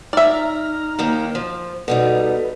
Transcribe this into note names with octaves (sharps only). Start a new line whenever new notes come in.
D#4 D5 E5 A#5 F6
D#2 D#3 A#3
F3
B2 G3 D#4 A4 B4